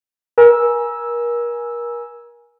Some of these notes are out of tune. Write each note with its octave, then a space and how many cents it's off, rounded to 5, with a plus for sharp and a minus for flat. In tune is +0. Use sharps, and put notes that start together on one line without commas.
A#4 +35 G#5 +0 E6 -5